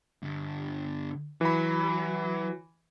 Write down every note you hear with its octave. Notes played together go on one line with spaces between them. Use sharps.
G2 D3
E3 F#3 B5